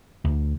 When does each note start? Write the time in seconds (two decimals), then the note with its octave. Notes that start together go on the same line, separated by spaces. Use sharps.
0.25 D2